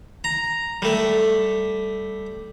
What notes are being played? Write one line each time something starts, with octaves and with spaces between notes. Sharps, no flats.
A#5
G3 A3